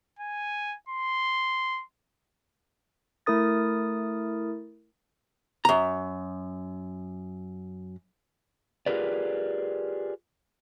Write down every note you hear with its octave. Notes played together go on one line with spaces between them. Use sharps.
G#5
C6
A3 E4 A#4 D#6 A6
F#2 A#5
F4 G4 G#4 A#4 B4 D5